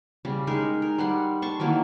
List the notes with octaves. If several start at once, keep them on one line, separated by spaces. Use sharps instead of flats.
C#3 G3
G#3 D#4 G#4 A#4
A#4
G3 F#5 C6
A5 C6 C#6
D#3 E3 F#3 A#3